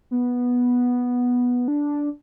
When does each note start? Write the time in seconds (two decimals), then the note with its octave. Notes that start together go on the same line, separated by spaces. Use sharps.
0.11 B3
1.68 D4